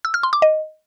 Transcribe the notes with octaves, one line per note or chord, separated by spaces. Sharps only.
E6
F6
C6
D6
D#5